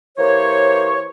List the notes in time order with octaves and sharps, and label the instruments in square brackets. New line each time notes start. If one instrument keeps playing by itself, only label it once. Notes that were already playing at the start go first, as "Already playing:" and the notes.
[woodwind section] E3 A#3 G4 C5 C#5